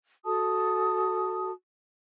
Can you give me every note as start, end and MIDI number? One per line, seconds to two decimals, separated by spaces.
0.25 1.51 66
0.25 1.51 69
0.25 1.51 81
0.25 1.51 87